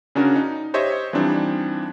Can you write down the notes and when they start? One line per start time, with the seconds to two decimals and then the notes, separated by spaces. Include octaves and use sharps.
0.15 C#3 C#4 D4 F#4 A#4
0.36 D#4
0.74 G4 C5 C#5 D#5 E5
1.13 E3 F3 G3 C4 D4 D#4